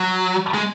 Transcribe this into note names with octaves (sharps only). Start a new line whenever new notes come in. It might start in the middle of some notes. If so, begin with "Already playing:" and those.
Already playing: F#3
G#3